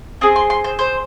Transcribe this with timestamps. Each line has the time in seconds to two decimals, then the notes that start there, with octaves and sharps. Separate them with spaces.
0.21 C4 G#4 D#6
0.36 C6
0.50 C6
0.64 C5
0.79 C5